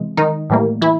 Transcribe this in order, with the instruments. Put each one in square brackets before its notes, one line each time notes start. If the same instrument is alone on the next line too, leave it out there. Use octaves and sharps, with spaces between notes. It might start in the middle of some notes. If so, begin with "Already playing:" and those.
Already playing: [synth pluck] C3 E3 G#3
D#3 D#4
A2 E3 G3 A#3
E3 E4